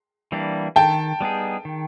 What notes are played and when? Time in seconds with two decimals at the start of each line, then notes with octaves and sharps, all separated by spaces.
0.32 E3 G3 A#3 D4
0.76 D#3 G5 A5
1.21 G3 B3 D#4 G#4
1.65 D#3